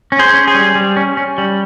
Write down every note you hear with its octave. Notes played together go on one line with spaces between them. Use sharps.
C#4
G#4 C5
C#4
G#4 C5
G3
G3
C#4
C#4
G3